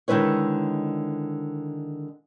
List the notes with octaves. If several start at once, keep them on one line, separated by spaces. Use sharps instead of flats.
D3 D#3 G#3 E4 B4 C#5